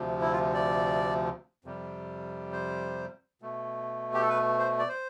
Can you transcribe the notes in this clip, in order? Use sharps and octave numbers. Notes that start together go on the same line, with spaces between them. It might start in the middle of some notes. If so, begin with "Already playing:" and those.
Already playing: D2 C3 F3
E4
F4
D5
F2 C3 G3
C5
B2 A3
G4
A4
B4
C5
D5
C5